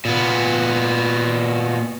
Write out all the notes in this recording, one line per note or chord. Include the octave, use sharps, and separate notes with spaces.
A#2 B3